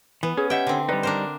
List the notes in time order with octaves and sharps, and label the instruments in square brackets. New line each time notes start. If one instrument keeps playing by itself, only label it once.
[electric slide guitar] E3 [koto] B3
[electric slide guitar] C#4 [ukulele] G#4
[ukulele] G4 D#5 F#5 [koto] E5 G5
[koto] D3 C4
[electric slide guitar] G3 D#4 [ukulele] B4 D5
[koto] D4 A#4 C5